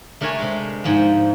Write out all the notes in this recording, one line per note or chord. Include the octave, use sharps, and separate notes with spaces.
A3 D4 A#4 C#5 G#5
C3 G#3
G#2 F3